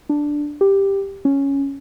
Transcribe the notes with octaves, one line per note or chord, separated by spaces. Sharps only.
D4
G4
C#4